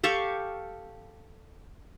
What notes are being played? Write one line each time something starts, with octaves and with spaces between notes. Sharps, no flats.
G4 A4 F5 C#6